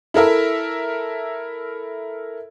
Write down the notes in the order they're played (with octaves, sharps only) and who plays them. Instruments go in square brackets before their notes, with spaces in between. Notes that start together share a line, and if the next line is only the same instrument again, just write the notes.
[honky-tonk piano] E4 A4 A#4 E5